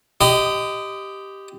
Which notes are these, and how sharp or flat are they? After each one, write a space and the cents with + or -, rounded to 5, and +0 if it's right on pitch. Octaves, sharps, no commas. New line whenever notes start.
G4 +0 D#5 +0 B5 +45